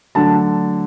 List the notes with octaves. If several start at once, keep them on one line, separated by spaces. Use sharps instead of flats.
D3 F#3 A3 A5